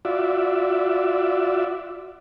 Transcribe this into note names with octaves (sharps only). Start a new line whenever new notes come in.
F4 F#4 D5 E5